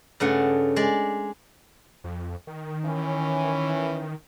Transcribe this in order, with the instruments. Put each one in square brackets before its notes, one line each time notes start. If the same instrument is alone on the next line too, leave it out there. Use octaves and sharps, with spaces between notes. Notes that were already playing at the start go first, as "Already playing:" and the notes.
[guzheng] G2 C#3 A3 F#5
G#3 D5
[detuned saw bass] F2
D#3
[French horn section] E3 C#4